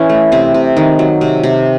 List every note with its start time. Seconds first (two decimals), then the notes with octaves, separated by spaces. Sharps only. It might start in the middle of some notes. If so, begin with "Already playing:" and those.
Already playing: E3 C#4
0.09 A3
0.32 C3 C4
0.54 C3
0.77 D#3
0.99 F#3
1.21 C3
1.43 C3